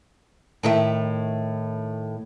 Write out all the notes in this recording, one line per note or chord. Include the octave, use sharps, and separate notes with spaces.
A2 D#3 E5